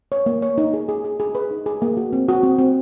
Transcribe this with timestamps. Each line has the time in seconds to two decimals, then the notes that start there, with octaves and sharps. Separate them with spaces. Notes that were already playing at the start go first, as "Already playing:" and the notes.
0.12 C#5
0.26 A#3
0.42 C#5
0.58 D#4
0.73 G#4
0.89 G#4
1.05 G#4
1.20 G#4
1.35 B4
1.51 D#4
1.66 G#4
1.82 A#3
1.97 F#4
2.13 C4
2.29 F#4
2.43 C4
2.59 C4